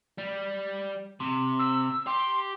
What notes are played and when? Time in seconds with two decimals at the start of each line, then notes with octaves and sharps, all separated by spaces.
0.18 G3
1.20 C3
1.59 E6
2.07 G4 C6